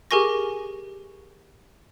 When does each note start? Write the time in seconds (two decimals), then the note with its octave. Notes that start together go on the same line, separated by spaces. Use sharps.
0.11 G4 G#4 A#4 G#5 C#6 A#6